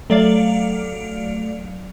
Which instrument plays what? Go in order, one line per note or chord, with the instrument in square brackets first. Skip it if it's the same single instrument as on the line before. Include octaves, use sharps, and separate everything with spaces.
[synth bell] F#3 D5 F5 [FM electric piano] A3